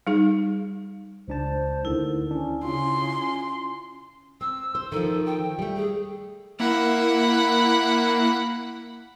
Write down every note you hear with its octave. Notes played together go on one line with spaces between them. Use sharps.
G3 D#4 G#4
C#2 D4 C5 A5
D2 D3 D#3 E4
C#4 D4
C#3 F4 C6
C#4
C4 E6
C5
D#3 F3 A4
G5
G3 A3
G#4
A#3 E4 F#5 B5